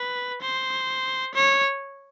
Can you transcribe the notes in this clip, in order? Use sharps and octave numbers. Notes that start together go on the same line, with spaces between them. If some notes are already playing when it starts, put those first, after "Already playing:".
Already playing: B4
C5
C#5